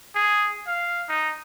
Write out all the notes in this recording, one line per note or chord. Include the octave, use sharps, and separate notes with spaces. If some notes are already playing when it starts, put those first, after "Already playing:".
G#4
F5
D#4